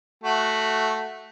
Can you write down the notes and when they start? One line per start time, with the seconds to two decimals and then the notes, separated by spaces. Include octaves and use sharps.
0.24 A3 F#4